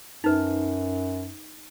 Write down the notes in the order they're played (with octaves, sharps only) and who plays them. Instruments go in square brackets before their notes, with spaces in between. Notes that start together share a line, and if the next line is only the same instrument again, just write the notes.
[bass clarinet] F#2 [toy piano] D#4 B4